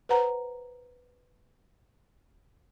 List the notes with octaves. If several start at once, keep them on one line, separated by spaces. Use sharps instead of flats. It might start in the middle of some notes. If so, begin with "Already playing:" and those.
B4 C5 F#5 A#5